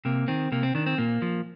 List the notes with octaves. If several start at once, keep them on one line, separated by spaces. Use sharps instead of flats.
C3 A#3
D#3 C4
C3 A#3
C4
D#3 D4
C4
A#2 A#3
F3